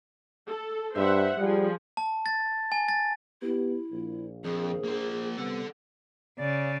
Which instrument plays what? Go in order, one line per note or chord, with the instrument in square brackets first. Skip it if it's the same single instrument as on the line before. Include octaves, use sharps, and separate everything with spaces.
[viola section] A4
[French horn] G2 [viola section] C5 E5 F#5
[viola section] F3 G#4 [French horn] G3
[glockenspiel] A5
A6
G#5
A6
[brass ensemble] B3 G4 [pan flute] E4
[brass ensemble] A#1
[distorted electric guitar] F2 [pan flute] G#4
[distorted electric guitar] A#3 C5
[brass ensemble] C3 G3 B3 [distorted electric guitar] A4 F#5
[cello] C#3 [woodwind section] D5